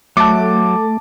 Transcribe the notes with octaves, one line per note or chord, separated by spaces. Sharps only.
F#3 A3 A5 D6